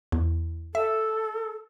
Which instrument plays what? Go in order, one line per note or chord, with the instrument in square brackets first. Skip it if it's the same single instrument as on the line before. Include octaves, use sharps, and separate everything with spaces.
[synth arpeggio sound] E2
[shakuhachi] A4 [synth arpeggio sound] E5